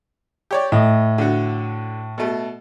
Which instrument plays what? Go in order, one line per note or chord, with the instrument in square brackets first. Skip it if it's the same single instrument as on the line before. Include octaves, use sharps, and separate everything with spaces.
[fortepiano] G4 C#5 D5
[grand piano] A2 [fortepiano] D#5
[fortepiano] D3 F#4
B2 A3